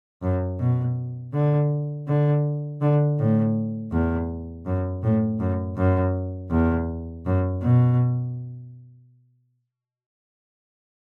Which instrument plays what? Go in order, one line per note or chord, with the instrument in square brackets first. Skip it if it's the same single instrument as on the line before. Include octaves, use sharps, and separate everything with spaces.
[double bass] F#2
B2
D3
D3
D3
A2
E2
F#2
A2
F#2
F#2
E2
F#2
B2